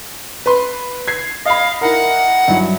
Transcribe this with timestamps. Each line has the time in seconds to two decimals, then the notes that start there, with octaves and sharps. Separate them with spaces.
0.46 B4 C6
1.08 G#6 C7
1.45 D#5 F5 B5
1.81 E4 A#4 F#5
2.48 G2 F#3 E4